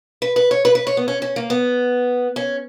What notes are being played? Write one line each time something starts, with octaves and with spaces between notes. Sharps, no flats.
B4
B4
C#5
B4
B4
C#5
B3
C#4
C#4
A#3
B3
C#4